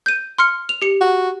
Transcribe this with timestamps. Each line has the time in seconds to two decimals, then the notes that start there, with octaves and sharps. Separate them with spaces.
0.06 G6 D#7
0.38 C6 F6 C#7
0.69 F7
0.82 G4 C#7
1.01 F#4